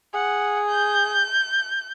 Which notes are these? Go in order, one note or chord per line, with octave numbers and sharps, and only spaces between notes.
G#4 F#5
G6